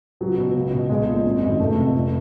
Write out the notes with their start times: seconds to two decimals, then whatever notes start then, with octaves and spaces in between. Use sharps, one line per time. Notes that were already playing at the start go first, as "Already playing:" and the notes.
0.21 C#2 F#3
0.37 B2
0.55 C#2
0.73 B2
0.89 B1 G#3
1.07 A#2 F3
1.25 G#1
1.43 F#2 D#3
1.59 F1 A3
1.77 F2 C3 F3
1.94 F1